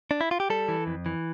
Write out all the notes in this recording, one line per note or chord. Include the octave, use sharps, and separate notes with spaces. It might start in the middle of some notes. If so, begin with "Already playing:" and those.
D4
E4
F4
G4
G3 A4
E3
F2
E3